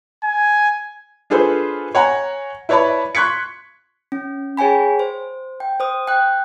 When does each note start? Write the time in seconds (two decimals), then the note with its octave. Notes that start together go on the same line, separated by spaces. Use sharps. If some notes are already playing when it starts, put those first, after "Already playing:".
0.24 G#5
1.30 D4 F4 G#4 A4 B4 C5
1.95 C#5 F#5 G#5 A#5
2.69 E4 B4 C#5 D5 A5 B5
3.15 C6 C#6 F#6 G#6 B6 C#7
4.12 C#4
4.57 G#4 C#5 G5 G#5 B5
4.99 C5
5.60 G5
5.80 C5 D#6
6.07 G5 F#6